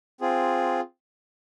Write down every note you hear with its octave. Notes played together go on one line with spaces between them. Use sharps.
C4 F4 G#4